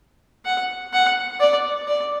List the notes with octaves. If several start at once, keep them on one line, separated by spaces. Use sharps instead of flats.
F#5
F#5
D5
D5